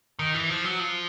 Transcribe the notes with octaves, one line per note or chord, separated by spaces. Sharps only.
D#3
E3
F3
F#3
F3